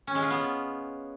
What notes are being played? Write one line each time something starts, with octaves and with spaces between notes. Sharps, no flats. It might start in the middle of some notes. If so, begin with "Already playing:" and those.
C#4
G#3
F4
B3